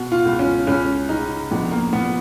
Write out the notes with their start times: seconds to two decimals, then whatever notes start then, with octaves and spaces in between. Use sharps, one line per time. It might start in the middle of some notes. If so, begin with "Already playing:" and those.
Already playing: B2 F#4
0.12 F4
0.25 C#2
0.39 C#4
0.67 C#2 C#4
1.09 C#3 D#4
1.51 A#1 B3
1.72 A#3
1.93 A#2 B3